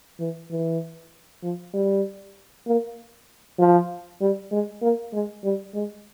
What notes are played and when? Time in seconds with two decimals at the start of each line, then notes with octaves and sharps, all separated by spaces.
0.20 E3
0.51 E3
1.43 F3
1.74 G3
2.67 A#3
3.59 F3
4.21 G3
4.51 G#3
4.82 A#3
5.13 G#3
5.44 G3
5.74 G#3